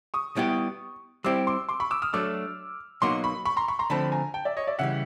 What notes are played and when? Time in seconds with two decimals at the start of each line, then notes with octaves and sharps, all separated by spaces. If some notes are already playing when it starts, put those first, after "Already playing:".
0.14 C#6 D#6
0.36 G3 B3 E4 G4
1.24 G3 C4 E4 G4 D6 E6
1.47 C6 D6
1.69 C6 D6
1.80 B5 C#6
1.91 D6 E6
2.02 D#6 F6
2.13 F#3 A3 D4 D6 E6
3.02 B2 F#3 A#3 D#4 F#4 C6 D6
3.24 B5 C#6
3.45 B5 C#6
3.57 A#5 C6
3.68 B5 C#6
3.79 A#5 C6
3.90 D3 F3 A3 C4 A5 B5
4.12 G#5 A#5
4.34 G5 A5
4.45 D5 E5
4.57 C#5 D#5
4.67 D5 E5
4.78 C#3 E3 G3 E5 F#5